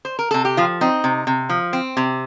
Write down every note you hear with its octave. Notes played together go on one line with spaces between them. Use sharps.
C5
A#4
C3 A4
G4
F3 F4
C4 D#4
C3
C3
F3
C4
C3